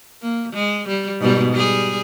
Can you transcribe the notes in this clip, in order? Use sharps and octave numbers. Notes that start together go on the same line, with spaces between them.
A#3
G#3
G3
G#2 B2 G3
G3 G#4